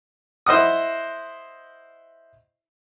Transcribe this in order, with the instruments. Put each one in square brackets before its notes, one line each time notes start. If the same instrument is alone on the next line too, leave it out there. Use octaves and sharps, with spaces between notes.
[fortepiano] E4 C5 D#5 F#5 D#6